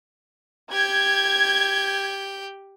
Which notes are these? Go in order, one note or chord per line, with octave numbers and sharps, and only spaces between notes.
G4 G6 G#6